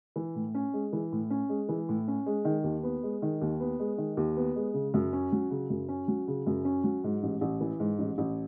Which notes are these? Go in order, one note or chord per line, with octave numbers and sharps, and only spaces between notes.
E3
A2
C#4
G#3
E3
A2
C#4
G#3
E3
A2
C#4
G#3
D#3
D#2
B3
G#3
D#3
D#2
B3
G#3
D#3
D#2
B3
G#3
C#3
F#2
C#4
F#3
C#3
F#2
C#4
F#3
C#3
F#2
C#4
F#3
G#2
A1
A1
E3
G#2
A1
A1